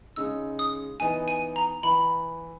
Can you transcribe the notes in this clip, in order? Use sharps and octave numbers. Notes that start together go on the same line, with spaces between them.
C#3 G#3 D#4 E6
D#6
E3 B3 D#4 G#5
G#5
A#5
E3 B5